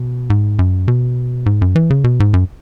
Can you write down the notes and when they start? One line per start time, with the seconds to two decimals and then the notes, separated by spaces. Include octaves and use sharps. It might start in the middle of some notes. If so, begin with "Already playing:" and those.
Already playing: B2
0.30 G#2
0.59 F#2
0.88 B2
1.46 G#2
1.62 F#2
1.76 E3
1.90 C#3
2.04 B2
2.20 G#2
2.34 F#2